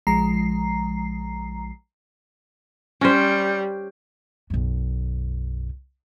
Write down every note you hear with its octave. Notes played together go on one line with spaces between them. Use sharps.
A#1 F3 G#3 A#5 C7
G3 C#4 C5
B1 F#2